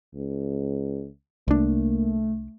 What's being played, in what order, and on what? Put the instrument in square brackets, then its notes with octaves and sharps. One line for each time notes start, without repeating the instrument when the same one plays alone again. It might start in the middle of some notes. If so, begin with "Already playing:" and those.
[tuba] C#2
[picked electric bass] C2 D4 [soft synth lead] A3 [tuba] A#3